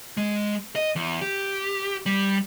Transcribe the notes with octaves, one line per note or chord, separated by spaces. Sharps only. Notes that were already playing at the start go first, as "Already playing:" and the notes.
G#3
D#5
E2
G4
G3